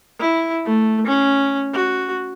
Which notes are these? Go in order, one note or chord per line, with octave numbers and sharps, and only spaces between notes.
E4
A3
C#4
F#4